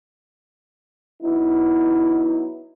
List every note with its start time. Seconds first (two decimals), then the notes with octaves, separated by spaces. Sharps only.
1.22 F#3 B3 D#4 E4